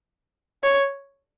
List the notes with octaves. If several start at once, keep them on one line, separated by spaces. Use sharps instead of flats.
C#5